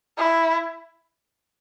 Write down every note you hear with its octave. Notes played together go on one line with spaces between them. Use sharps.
E4